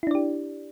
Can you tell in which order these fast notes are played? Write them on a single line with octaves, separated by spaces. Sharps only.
E4 D4 D5 G4